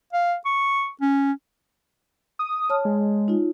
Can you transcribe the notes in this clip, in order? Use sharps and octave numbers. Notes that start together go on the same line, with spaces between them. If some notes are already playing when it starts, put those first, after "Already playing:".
F5
C#6
C#4
D#6
C#5 A5 F6
G#3
D#4 F4